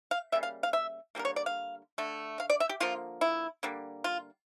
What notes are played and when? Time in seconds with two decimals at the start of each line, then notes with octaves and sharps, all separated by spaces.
0.11 F5
0.32 C#3 G3 A#3 E5
0.43 F5
0.63 F5
0.73 E5
1.15 D3 G3 A#3 A#4
1.25 C#5
1.36 D5
1.46 F5
1.98 D3 A3
2.40 F5
2.50 D5
2.60 E5
2.69 G4
2.80 D3 F3 A#3 F4
3.21 E4
3.63 D3 G3 A#3
4.04 F4